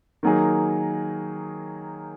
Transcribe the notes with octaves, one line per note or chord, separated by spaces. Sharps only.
D#3 F#3 A#3 D#4 G#4